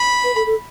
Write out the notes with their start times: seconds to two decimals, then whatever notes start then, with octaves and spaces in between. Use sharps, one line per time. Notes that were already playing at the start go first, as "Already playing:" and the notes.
Already playing: B5
0.24 B4
0.36 A4
0.46 A4